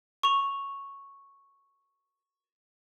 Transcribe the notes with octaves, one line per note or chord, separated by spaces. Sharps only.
C#6 F7